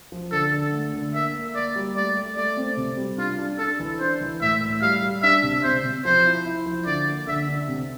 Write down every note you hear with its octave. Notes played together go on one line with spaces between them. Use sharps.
F3
D3 A4
D3
A3
D3
A#3 E5
A#3
A#3 D5
G3
A3 D5
A3
A3 D5
C4
C3
G3
D4 F4
D4
D4 A4
E3
D4 C5
E3
A2 E5
A2
G3 F5
G3
D4 E5
C3
C3 C5
C3
F3 C5
E4
E4
F3
D3 D5
A#3
D3 E5
D3
C3